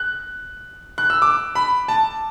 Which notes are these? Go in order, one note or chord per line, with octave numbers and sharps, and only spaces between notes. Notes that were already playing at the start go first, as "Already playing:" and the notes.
Already playing: F#6
F#6
E6
D6
B5
A5